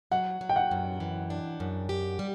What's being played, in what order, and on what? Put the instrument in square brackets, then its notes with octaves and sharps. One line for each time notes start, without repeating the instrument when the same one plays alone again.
[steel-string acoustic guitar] F#3 [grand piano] F#5
[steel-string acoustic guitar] F#3
[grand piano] G5
F#5
[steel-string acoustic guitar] F#2
E3
D4
F#2
G4
G3